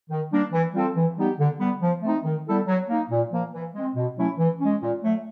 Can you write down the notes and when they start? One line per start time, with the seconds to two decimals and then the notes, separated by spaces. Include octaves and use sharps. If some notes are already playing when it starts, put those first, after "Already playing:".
0.10 D#3
0.31 G3 A#3 D4
0.53 E3
0.74 G3 C4 F4 A4
0.95 E3
1.16 G3 B3 D#4 G4
1.38 D3
1.59 G3 B3
1.81 F3
2.02 A3 C4 D#4
2.24 D#3
2.46 G3 B3 E4 A4
2.67 F#3
2.88 A#3 D#4
3.10 A#2
3.31 F3 A#3
3.53 E3
3.74 G#3 C4
3.95 B2
4.17 F#3 A3 C#4 E4
4.38 E3
4.60 G#3 C#4
4.81 A#2
5.02 F#3 A3